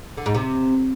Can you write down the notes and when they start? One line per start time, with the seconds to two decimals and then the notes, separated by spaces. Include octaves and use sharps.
0.17 D3
0.26 G#2
0.35 C3